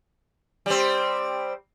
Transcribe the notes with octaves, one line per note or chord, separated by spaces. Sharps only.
G3 C4